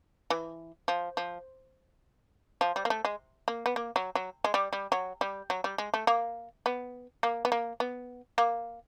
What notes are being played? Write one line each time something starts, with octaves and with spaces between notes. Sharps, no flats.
E3
F3
F3
F3
G3
A#3
A3
G#3
A#3
B3
A#3
F#3
F#3
G#3
G3
G3
F#3
G3
F#3
G3
G#3
A3
A#3
B3
A#3
B3
A#3
B3
A#3